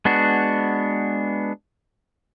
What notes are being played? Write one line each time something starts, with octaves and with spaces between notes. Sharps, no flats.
G#3 B3 D4 F#4